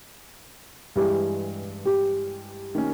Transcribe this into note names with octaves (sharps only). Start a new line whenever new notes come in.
G2 E3 G#3 G4
G4
D#3 A#3 C#4